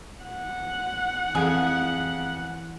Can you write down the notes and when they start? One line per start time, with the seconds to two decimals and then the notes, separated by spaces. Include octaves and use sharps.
0.24 F#5
1.35 F2 E3 G#4